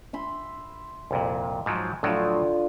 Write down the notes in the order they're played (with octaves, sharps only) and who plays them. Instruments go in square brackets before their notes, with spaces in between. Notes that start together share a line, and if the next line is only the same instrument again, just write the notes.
[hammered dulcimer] E5 B5 C6
[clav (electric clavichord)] C2 F2 A#2
G#2 F3 F#3
[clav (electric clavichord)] A2 F3 F#3 [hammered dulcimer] D3 F4